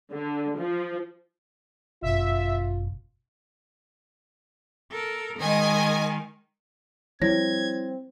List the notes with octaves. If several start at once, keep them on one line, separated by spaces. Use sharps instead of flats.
D3
F3
G1 F#2 B2 F4 E5
A4 A#4
D#3 G#3 D#5 G#5
F3 G3 C4 E4 C#5 G#6 A#6